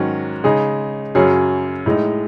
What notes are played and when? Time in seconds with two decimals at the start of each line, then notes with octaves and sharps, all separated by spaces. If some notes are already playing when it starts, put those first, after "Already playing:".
Already playing: G#2 D#3 F#3 C#4 F#4
0.44 C#3 G#3 D#4 G#4
1.15 F#2 C#3 F#3 C#4 G#4
1.86 A2 G#3 D#4